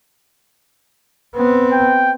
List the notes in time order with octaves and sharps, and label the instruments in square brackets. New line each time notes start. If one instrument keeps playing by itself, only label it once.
[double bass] B3 C4
[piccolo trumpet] G5